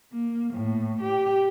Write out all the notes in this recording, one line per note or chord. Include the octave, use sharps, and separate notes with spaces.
A#3
A2
G4